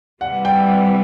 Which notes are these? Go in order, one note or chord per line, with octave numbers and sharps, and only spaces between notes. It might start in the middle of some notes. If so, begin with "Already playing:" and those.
C3 E3 G3 F#5
G5
F#5